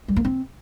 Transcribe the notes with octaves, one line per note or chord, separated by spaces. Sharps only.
G3
A#3
C4